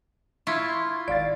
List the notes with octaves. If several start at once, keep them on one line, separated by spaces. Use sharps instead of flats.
E4 F4 C#6 G#6
G#1 D5 F5 A6